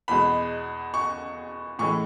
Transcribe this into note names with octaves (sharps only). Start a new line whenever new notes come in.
E2 B2 G#3 B5
C#6
A2 E3 G#3 C#6